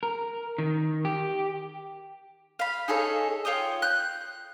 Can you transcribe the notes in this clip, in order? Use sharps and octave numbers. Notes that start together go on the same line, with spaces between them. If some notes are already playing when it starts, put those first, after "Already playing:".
A#4
D#3
G4
F5 B5
D#4 G#4 A4 C#5
F4 C#5 G5 D#6
F#6 G6